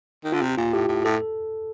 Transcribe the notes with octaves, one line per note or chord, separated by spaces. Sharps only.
D#3
D3 F4
C3 G4
A#2 F4
A2 G4
A2
A2 A4